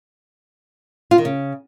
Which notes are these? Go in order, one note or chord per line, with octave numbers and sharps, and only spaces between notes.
F4
D#3
C#3